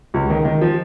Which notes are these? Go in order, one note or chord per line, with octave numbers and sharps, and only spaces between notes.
C#2
D#3
D#3
F3